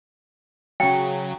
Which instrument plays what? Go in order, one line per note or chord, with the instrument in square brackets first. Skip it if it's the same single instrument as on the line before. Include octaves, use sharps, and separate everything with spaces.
[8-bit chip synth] C#3 F#3 [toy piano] G5